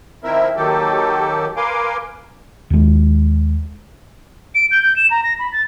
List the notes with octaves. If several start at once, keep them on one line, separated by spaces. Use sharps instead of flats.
D#3 F3 C4 E4 A#4 E5
D#2 D#3 F#3 G4 A4
A#4 B4 F5 G#5 C6 D6
D#2 G#3
D7
G6
G6
E7
A#5
A#6
B5
A6